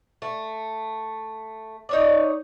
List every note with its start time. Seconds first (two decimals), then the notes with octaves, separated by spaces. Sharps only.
0.22 A3
1.89 D#4 C#5 D5